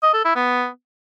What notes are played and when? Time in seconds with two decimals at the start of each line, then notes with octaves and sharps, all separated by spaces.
0.03 D#5
0.14 A4
0.24 E4
0.35 B3